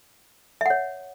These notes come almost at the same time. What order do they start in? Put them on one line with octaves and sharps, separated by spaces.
E5 F#5 C#5